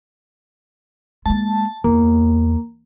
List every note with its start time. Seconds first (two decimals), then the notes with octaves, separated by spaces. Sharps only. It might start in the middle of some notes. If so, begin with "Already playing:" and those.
1.26 G#3 A#3 A5
1.84 E2 A#3